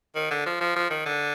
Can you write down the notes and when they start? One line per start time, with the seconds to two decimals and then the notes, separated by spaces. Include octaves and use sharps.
0.15 D#3
0.30 D3
0.46 F3
0.60 F3
0.76 F3
0.90 D#3
1.06 D3